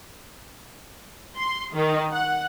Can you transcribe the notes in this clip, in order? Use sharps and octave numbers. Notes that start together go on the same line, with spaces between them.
C6
D#3
F#5